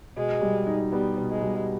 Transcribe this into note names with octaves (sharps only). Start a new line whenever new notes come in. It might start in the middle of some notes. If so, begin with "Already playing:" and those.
B2 G#3
G3
D#4
G3 B3
B2
G#3
G3